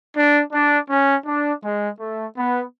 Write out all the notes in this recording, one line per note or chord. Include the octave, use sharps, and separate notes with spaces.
D4
D4
C#4
D4
G#3
A3
B3